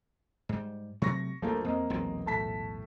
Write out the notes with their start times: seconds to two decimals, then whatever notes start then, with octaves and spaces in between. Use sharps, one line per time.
0.49 G#2 G3
1.02 C3 F#3 A3 C#6 A#6
1.42 D2 F3 G3 A3 A#3
1.65 F2 A#3 C4 D#5
1.90 E1 B1 A#2
2.26 A2 A5 B6